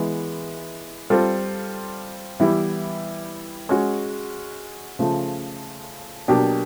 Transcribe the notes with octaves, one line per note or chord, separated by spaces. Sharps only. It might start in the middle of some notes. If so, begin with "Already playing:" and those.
Already playing: E3 G#3 B3
G3 C4 F4 A4
E3 G3 B3 E4 G4
G#3 C#4 F#4
C#3 F3 A3
B2 F#3 A#3 D4 G4